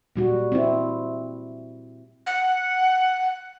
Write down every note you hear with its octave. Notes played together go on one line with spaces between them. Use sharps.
A#2 G3 F#4
C4 E4
F#5